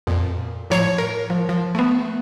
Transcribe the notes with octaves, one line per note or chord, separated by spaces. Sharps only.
F2 A#2
A2 F3 C#5 A#5 C#6 C7
A#4
F3
F3
A3 B3